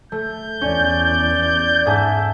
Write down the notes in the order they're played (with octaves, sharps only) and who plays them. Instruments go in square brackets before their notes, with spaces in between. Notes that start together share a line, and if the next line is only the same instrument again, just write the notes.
[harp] A3 [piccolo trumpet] G6
[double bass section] E2 [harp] C#4 [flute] D5
[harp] G#2 G#4 A5 [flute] E5